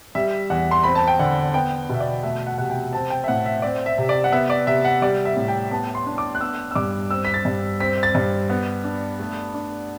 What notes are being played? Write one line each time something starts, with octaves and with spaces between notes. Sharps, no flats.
G3 E5
E2 F#5
C6
C4 B5
A5
G5
D3 F#5
B3 G5
B2 E5
D5
A3 E5
F#5
C3 F#5
G5
C4 A5
G5
E5
A2 F#5
E5
C4 D5
E5
C3
D5
F#5
B3 E5
D5
C3 E5
F#5
G3 D5
E5
A2
G5
B3 A5
C6
D4
D6
F#6
B3 E6
E6
G2 D6
C4 E6
B6
A6
G2
C4 B6
A6
G2
B3
D4
A3
D4